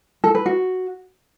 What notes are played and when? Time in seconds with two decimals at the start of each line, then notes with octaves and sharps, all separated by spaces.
0.24 A4
0.35 B4
0.46 F#4